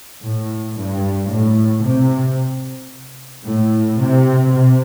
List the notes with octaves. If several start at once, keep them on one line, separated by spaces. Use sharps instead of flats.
A2
G2
A2
C3
A2
C3
C3